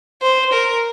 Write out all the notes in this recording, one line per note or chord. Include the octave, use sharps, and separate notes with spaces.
C5
A#4